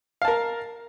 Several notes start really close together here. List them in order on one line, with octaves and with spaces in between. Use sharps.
F5 A5 A#4